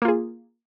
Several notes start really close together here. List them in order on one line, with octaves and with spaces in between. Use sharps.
A#3 F4 G#4